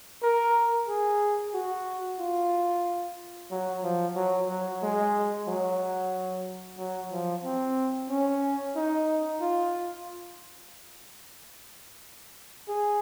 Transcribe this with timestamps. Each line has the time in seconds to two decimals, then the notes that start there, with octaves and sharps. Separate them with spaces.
0.23 A#4
0.88 G#4
1.54 F#4
2.20 F4
3.51 F#3
3.83 F3
4.16 F#3
4.49 F#3
4.83 G#3
5.48 F#3
6.78 F#3
7.12 F3
7.44 C4
8.10 C#4
8.76 D#4
9.41 F4
12.69 G#4